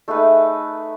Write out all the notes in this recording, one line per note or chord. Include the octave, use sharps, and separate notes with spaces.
A3 D#4 G#4 B4